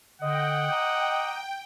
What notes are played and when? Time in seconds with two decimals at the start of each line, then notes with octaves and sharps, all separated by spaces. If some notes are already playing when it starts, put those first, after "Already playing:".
0.22 D3 D#5 F#5 G5
0.71 A#5 D6 D#6